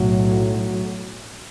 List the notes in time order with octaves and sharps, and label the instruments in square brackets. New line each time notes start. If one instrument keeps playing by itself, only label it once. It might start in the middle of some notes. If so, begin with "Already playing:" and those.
Already playing: [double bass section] B1 A2 F#3